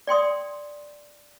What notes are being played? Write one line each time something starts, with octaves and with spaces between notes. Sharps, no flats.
D5 G5 C6 D#6